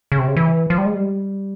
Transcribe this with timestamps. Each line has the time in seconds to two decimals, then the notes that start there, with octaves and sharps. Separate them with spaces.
0.12 C#3
0.19 C3
0.28 C#3
0.37 E3
0.70 F3
0.78 G3
0.86 G#3
0.94 G3